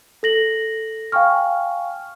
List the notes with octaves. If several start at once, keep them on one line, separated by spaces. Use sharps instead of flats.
A4 A#6 F#7
F5 G5 G#5 C#6 F6